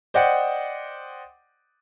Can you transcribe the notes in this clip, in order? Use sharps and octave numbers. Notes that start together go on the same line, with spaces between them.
C5 D5 D#5 F#5 G5